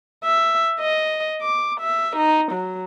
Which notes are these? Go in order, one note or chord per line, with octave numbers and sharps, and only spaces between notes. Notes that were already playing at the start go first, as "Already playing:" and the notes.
E5
D#5
D6
E5
D#4
F#3